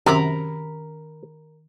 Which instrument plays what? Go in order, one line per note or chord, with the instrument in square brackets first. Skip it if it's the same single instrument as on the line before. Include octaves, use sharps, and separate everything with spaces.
[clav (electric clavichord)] F#2 C3 [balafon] D#3 C#4 [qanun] A#4 A#5 B5